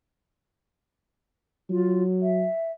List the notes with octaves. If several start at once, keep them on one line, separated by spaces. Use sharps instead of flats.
F#3 F4
E5